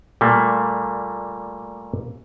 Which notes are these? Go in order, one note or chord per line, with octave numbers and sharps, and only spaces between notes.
A#2 G3 A3 A#3